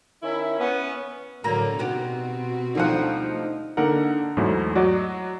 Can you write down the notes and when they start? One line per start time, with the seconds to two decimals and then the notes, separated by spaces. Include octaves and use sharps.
0.23 D#3 C#4 E4
0.58 B3 C#4
1.44 A2 D3 F#3 A#3 A4 A#5
1.79 B2 B3 C4 D#4 F#4 G4
2.75 D2 D3 F3 G3 D#4 F#5
3.77 D3 A#3 D#4 A#4 F#5
4.37 E2 G#2 F#3 A3 E4
4.75 F#3 F#4 D5 D#5